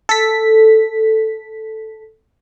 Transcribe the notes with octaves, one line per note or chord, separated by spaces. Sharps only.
A4 B6